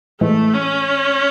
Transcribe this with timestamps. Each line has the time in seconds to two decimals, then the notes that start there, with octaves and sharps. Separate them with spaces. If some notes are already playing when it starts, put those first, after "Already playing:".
0.21 A2 E3 G#3 A3
0.54 C#4